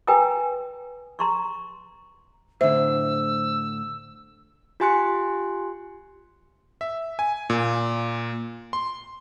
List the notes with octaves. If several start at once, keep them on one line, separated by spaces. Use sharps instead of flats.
B4 G5 G#5 A#5 D#6
A#5 C6 C#6
A2 D3 C5 E5 E6
F4 G4 G#5 C6 F#6 C#7
E5
G#5
A#2
C6